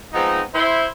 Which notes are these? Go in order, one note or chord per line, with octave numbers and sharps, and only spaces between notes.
F3 G#3 B3 C4 D#4
E4 C5